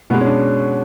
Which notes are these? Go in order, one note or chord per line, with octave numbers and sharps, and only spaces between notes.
B2 G#3 B3
C#4
D4